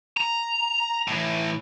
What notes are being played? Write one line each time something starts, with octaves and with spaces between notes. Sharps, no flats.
A#5
A2 E3